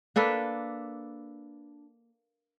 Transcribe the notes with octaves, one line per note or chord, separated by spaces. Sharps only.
A#3 D4 A4 B4